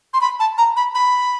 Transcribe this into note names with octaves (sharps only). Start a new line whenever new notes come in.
C6
B5
A5
A#5
B5
B5